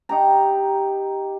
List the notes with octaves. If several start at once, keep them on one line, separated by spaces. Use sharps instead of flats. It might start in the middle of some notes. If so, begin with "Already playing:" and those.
D#4 G4 A#5